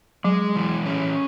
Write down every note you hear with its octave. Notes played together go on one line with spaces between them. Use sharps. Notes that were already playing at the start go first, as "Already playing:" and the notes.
F#3 G#3
E3
C#4